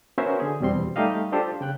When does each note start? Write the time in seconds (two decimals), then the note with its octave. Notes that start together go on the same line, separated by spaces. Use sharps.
0.18 B3 C#4 F#4 A#4 C5 E5
0.40 D3 G#4
0.61 E2 B2 G3 C4 C6
0.96 G3 A3 D#4 G4 D#5 F5
1.32 D4 F4 G4 A4 C5
1.61 C#3 G5 F#6